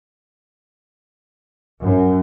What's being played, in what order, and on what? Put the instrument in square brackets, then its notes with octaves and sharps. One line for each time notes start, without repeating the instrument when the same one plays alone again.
[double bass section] F#2